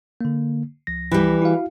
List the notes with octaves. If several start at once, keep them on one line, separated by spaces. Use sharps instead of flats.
D3 A#3
C#2 F3 A#6
E3 G3
E4 F#4 F5